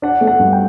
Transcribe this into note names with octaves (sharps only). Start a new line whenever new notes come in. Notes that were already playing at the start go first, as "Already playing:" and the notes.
D4 F#5
A3
F#5
G2
G5